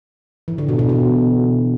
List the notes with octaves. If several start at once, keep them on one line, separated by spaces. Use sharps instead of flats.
E3
D3
B2
B2
B2